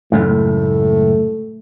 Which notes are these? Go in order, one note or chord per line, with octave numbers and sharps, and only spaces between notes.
C#2 F#2 A2 A3